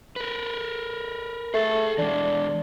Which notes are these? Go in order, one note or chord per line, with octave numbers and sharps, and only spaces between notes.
A#4 B4
A3 G#4 A5
E3 G#3 D4